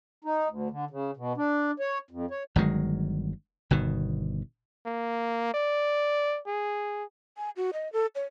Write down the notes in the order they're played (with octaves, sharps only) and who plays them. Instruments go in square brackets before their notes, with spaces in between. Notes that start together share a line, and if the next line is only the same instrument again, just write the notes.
[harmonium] D#4
D2
D3
C#3
B2
D4
C#5
F2
C#5
[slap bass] G1 D#3 F#3 G#3
G1 B2 D#3
[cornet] A#3
D5
G#4
[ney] G#5
F#4
D#5
A4
C#5